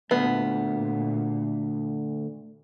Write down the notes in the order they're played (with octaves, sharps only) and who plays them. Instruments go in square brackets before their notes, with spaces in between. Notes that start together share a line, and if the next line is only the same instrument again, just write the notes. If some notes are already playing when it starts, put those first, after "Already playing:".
[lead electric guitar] D2 [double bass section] A#2 [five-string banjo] B3